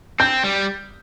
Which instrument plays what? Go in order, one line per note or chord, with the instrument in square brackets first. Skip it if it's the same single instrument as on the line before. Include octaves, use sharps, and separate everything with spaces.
[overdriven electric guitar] C4 [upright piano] G6
[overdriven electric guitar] G3